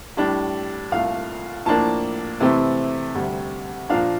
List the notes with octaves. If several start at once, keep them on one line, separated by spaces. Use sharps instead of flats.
A2 G3 D4
C2 A#2 A3 F5
A2 F3 A#3 D4 A5
C3 E3 A3 C4 E4
D2 C3 G3
A#2 F3 A#3 D4 F5